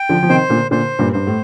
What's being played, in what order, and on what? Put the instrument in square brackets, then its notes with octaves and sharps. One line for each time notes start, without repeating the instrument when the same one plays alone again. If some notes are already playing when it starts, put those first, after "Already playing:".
Already playing: [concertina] G5
[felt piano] D3 F3
F3
[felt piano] C3 D#3 [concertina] C5
[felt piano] A#2 D3
[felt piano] A#2 D3 [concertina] C5
[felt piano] G2 A#2
[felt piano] G2 [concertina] C5
[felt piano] A2